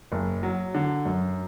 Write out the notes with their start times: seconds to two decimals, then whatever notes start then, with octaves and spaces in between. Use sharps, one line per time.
0.12 F#1
0.43 F#3
0.74 D3
1.05 F#2